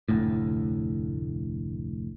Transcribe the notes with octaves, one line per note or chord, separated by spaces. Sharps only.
F1 D2 A2